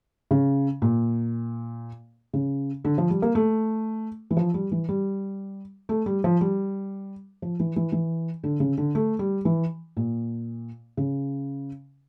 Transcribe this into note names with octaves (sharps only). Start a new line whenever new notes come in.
C#3
A#2
C#3
D3
F3
G3
A#3
A3
E3
F3
G3
E3
G3
A3
G3
F3
G3
F3
E3
E3
E3
D3
C#3
D3
A3
G3
E3
A#2
C#3